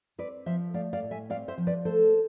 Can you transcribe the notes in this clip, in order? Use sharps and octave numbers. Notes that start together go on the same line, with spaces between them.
C4 B4 D5
F3 C5 E5
A3 D5 F5
D5 F5
A2
E5 G#5
C4 D5 F5
C5 E5
F3
B4 D5
A3 A4 C5